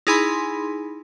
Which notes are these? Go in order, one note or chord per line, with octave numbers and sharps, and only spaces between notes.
D#4 E4 G#4 G#5 B5 C6